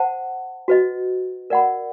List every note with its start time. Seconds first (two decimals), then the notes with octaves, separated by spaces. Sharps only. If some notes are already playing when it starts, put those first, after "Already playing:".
Already playing: C5 F#5 A5
0.68 F#4 B4 D#5
1.50 A#4 D5 F#5 B5